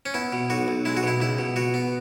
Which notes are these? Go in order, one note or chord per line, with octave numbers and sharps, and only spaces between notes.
C#4
B3 E4
B2
B1 F#4
B1
G#3 E4
F#4
B2 E4
C#2 E4
B2
B2 F#4
B3